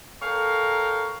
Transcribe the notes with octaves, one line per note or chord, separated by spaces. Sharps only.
A4 A#4 C#5 F5 G5 A#5